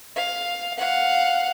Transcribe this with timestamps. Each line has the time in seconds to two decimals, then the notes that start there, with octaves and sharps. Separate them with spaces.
0.16 F5
0.77 F5 F#5